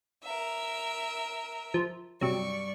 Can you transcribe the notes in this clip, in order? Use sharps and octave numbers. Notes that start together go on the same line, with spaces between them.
A#4 E5
F3
G2 C3 F#3 D5 C#6